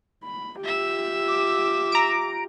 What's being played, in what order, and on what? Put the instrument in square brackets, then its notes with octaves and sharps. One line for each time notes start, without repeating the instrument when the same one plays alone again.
[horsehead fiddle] B5
[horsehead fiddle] F4 G4 [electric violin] E5 E6
[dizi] D6
[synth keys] A#5 D7